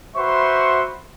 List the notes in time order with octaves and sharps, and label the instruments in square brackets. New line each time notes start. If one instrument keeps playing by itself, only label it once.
[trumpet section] F#4 B4 C5 E5 C6 C#6